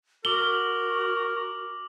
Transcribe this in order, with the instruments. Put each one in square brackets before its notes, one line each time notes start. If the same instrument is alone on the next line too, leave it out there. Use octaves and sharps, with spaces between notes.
[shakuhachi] F#4 [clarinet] A#4 [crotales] D6 F#7 [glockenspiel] G7